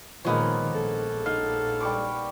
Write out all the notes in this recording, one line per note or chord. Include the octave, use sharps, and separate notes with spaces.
A#2 D#3 F3 G#3 A#3 B3 C#5
A#1 A4
D#4 F5
G3 C#6 D6